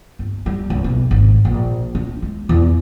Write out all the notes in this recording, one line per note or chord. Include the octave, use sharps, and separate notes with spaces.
G1
G3
C#2
B1
G#1
A#1
D4
G#3
E2